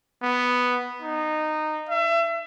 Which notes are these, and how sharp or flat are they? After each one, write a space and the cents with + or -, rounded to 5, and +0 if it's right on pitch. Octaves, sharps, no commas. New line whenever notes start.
B3 +0
D#4 -15
E5 +35